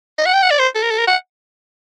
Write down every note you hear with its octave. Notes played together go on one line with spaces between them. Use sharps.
D#5
F#5
G5
F#5
D5
C5
A4
A#4
A4
A#4
F#5